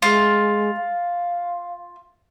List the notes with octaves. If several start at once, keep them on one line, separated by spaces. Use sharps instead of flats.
G#3 F4
F5